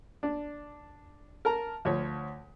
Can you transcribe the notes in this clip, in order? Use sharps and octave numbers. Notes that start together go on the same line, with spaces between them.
D4
A#4 A5 A#5
D2 F3 C#5